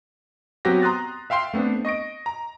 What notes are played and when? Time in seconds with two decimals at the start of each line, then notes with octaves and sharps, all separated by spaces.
0.65 F#3 B3 C4 F#4 G4 A#6
0.82 A#5 C6 D#6 F#6 A6
1.30 E5 F5 G5 C6 C7
1.54 A3 B3 C4 D4
1.85 D#5 C#6 A#6 D7
2.26 A#5